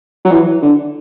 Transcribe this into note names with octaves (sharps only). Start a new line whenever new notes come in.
F#3
E3
D3